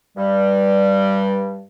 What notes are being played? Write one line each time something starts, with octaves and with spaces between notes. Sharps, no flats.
G2 G3